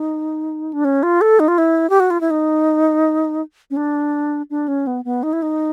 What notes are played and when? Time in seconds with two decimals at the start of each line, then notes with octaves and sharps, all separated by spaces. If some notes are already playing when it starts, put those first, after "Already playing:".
Already playing: D#4
0.73 D4
0.85 C#4
1.03 F4
1.21 A4
1.40 D#4
1.48 F4
1.58 E4
1.90 G4
2.00 F#4
2.10 F4
2.21 E4
2.30 D#4
3.71 C#4
3.77 D4
4.50 D4
4.68 C#4
4.87 B3
5.05 B3
5.23 D#4
5.33 E4
5.42 D#4